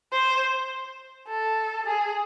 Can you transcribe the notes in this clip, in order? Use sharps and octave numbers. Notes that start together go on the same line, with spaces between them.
C5
A4
G#4